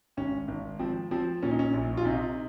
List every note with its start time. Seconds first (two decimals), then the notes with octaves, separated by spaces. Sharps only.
0.17 G#1 C#4
0.48 G#1
0.79 F3 C4
1.11 F3 C4
1.42 A#2 C#4
1.51 D#4
1.59 C#4
1.74 A#1
1.97 F4
2.05 C3 D#4